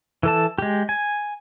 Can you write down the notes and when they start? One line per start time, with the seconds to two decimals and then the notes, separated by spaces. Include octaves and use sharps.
0.23 E3 A4 A5
0.58 G#3 G4
0.89 G#5